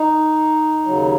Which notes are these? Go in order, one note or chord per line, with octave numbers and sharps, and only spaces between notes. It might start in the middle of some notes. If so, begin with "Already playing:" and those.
Already playing: D#4
D#2 C#3 F#3